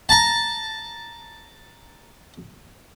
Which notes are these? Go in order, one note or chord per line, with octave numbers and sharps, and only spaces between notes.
A5 A#5